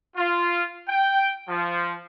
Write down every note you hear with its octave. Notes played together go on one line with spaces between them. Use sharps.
F4
G5
F3